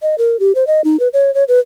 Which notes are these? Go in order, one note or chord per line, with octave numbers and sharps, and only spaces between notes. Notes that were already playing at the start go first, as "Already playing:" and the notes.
D#5
A#4
G4
C5
D#5
D#4
B4
C#5
C#5
B4